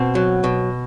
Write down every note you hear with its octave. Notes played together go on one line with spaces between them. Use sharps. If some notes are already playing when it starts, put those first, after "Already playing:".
Already playing: B2 C4
F#3
B2